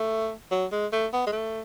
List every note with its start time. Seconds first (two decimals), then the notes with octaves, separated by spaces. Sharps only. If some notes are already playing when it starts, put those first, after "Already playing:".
Already playing: A3
0.51 F#3
0.72 G#3
0.92 A3
1.13 B3
1.27 G#3
1.33 A3